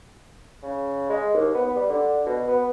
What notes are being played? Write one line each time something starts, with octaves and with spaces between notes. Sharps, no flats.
C#3
G#3
D#2
B3
G3
D3
B2
B3